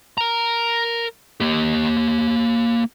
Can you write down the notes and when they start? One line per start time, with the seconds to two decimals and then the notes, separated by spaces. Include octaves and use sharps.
0.18 A#4 A#5
1.40 A#3 G4